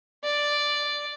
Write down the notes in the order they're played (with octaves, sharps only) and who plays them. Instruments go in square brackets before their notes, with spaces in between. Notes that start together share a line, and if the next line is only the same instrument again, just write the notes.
[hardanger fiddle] D5